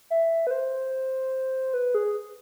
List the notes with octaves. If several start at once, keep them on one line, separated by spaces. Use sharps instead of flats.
E5
B4
C5
B4
G#4